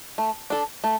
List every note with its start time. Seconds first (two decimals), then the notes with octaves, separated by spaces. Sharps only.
0.18 A3
0.50 D4 A4
0.84 A3